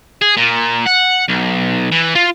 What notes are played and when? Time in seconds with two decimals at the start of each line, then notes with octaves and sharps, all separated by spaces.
0.22 G#4
0.37 A#2
0.86 F#5
1.28 B1
1.92 E3
2.15 F4